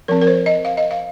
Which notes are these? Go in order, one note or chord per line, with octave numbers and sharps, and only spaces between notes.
F3 C4 A#4
A#4
C5
D#5
F5
D#5
F5